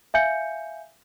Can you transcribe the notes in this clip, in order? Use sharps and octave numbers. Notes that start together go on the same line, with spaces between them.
E5 F5 G#5 G6 C#7